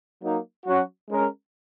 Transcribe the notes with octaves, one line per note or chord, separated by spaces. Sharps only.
F#3 A#3 D#4
F#3 C#4 F#4
G#3 C#4 A#4